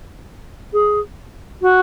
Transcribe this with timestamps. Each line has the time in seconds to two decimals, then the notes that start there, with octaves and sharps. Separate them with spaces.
0.73 G#4
1.62 F#4